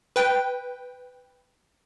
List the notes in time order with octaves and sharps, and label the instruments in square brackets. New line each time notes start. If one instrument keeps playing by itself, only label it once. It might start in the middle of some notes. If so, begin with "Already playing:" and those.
[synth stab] B4 G5